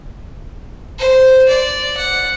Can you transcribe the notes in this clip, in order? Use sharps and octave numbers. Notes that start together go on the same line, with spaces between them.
C5
D5
F#5